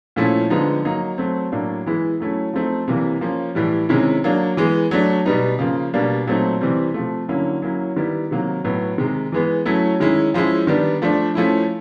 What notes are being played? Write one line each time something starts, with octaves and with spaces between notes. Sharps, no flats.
A#2 F3 A3 C#4 E4
D3 F3 G#3 B3 D#4
F#3 A#3 D#4
F#3 A3 C4
A2 F#3 A#3 D4
E3 G#3 B3 E4
F#3 A3 C#4 E4
F3 A3 C4 D#4
C3 E3 G3 A#3
F3 A#3 C#4
A2 E3 G3
C3 D#3 G#3 C#4 E4
F#3 A#3 D4
E3 G#3 B3
F#3 A3 D4
B2 G3 B3 D#4
C#3 F3 A#3
B2 G3 A#3 D4
A#2 F#3 A3 C4 D#4
C3 E3 G3 C4
C3 F3 A3
D3 F#3 A#3 C#4 E4
F#3 A#3 C#4 E4
D#3 G3 B3 E4
C3 D#3 F#3 A#3
A2 F#3 B3
C3 D#3 G#3
E3 G#3 B3
F#3 A3 C#4 E4
D#3 G#3 C#4 E4
F3 G#3 C#4 E4
D#3 G3 B3 D4
F3 A3 D4
F3 A3 C#4 E4